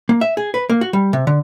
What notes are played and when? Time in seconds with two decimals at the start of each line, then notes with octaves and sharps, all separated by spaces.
0.09 A#3
0.21 E5
0.37 G#4
0.54 B4
0.70 A#3
0.81 F#4
0.93 G3
1.13 C3
1.27 D3